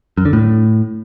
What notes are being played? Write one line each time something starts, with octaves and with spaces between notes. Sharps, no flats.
F#2
D3
A2